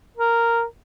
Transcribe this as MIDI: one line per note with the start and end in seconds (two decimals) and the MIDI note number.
0.17 0.64 70